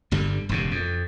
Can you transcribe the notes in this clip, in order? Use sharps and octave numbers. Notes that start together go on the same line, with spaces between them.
G1 G2 D3 G3
E1 G2 C#3
F2